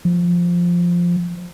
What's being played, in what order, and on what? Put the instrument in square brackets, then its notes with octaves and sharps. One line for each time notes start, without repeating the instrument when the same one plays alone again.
[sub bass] F3